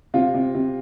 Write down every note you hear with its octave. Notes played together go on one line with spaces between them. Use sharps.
C3 F4
C3
C3